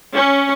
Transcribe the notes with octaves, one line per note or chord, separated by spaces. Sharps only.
C#4